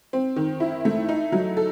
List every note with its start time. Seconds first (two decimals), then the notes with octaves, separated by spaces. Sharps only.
0.13 C4
0.36 D#3
0.60 E4
0.85 A3
1.09 D#4
1.32 F#3
1.57 A4